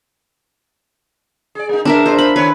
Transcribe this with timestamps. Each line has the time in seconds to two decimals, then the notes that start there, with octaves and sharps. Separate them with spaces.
1.55 G#4 D5
1.69 A#3 D#4
1.85 G#3 B3 D4 A#4 E5
2.06 D4 F4 C5
2.18 B5
2.36 D#3 B4 C#5